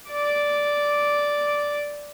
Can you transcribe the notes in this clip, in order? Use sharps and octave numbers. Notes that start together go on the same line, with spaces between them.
D5 D6